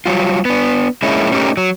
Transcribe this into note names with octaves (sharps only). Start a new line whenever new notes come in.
F#3 G3 F4
B3 D4
G#3 A#3 C#4 E4
A3 C#4 D#4 F#4 G4 A#4
F#3